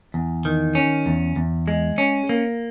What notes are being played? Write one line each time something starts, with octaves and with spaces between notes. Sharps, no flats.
E2
D#3
C#4
E2
E2
G#3
C#4
A#3